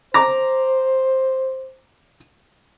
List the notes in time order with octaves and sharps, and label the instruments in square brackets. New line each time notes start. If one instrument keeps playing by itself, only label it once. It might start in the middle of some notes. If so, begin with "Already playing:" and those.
[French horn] C5 [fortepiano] A#5 D6